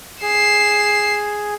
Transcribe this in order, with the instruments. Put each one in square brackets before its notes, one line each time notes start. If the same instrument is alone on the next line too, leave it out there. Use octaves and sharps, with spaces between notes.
[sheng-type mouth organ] G#4 [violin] C7 E7